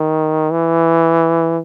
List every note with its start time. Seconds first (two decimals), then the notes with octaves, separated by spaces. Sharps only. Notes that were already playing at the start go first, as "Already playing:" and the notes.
Already playing: D#3
0.51 E3